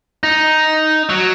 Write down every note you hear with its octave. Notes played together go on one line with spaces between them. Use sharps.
D#4
F#3